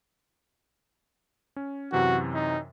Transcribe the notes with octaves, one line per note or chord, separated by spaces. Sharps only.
C#4
F#2 C3 E3 F#4
D#4